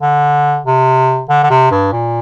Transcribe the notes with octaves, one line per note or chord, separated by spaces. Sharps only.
D3
C3
D3
D3
C3
G2
A#2